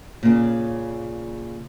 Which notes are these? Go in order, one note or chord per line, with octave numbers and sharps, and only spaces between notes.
A#2 C#3